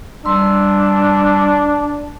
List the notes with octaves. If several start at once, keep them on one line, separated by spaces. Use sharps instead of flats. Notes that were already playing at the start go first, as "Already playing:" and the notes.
G3 D4 C6 E6